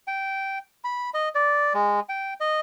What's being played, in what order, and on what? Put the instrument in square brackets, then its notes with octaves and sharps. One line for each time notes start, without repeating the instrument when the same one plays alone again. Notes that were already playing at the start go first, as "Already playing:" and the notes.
[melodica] G5
B5
D#5
D5
G#3
G5
D#5